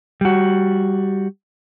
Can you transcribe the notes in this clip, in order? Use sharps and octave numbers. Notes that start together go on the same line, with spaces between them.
G3 F#4